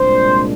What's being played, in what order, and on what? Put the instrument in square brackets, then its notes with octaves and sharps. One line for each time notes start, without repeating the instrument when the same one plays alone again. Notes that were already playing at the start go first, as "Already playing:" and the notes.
Already playing: [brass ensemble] C2 A#2 G#3 D4 C5